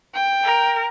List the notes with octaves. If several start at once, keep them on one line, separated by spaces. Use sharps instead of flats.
G5
A#4